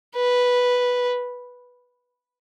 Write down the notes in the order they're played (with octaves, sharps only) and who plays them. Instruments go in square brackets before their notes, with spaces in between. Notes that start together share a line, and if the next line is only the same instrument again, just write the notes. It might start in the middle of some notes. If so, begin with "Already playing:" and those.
[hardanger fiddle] B4